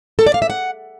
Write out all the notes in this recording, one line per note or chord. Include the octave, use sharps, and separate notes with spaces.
A4
D5
F5
E5
F#5